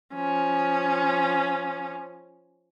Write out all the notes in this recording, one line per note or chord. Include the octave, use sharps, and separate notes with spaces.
F3 C#4